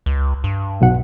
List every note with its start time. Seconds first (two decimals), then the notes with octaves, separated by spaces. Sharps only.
0.06 C#2
0.44 G2
0.81 B1 B2 F#5